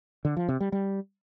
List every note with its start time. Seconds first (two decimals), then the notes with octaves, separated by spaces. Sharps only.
0.25 D3
0.37 F3
0.49 C3
0.60 G3
0.72 G3